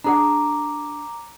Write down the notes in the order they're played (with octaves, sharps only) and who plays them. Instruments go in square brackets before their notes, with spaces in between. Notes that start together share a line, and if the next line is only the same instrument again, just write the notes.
[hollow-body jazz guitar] D4 G#4 F#5 [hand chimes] A#5 D6